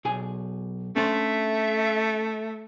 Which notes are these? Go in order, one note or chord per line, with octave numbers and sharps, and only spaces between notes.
B1 G#4 G#5
A3 C#4 D4 C5 E5